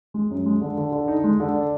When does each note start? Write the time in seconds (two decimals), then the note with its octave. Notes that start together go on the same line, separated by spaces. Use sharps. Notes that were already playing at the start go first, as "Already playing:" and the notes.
0.14 G#3
0.31 F#2
0.46 G#3
0.61 D3
0.77 D3
0.92 D3
1.08 D#4
1.24 G#3
1.40 D3
1.55 D4